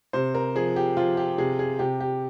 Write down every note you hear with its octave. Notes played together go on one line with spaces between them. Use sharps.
C3 C5
A#4
F3 G#4
G4
F3 F4
G4
C3 G#4
G#4
C3 G4
G4